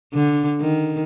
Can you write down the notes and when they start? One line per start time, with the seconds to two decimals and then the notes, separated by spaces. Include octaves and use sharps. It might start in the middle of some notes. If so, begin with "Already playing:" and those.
0.13 D3
0.60 D#3